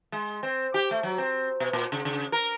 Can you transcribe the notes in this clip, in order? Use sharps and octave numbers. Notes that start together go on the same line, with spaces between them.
G#3
C4
G4
A3
F#3
C4
B2
A#2
C#3
C#3
A#4